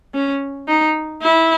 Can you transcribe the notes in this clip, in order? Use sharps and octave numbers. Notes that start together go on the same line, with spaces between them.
C#4
D#4
E4